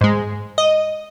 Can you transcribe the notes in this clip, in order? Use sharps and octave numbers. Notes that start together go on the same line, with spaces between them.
G#2 G#3
D#5